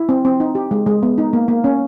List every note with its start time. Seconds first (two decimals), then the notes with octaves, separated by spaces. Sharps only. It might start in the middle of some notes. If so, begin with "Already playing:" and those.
Already playing: E4
0.09 C4
0.25 C4
0.40 D#4
0.55 G4
0.71 G#3
0.87 G#3
1.03 B3
1.18 D#4
1.33 A#3
1.48 A#3
1.64 C#4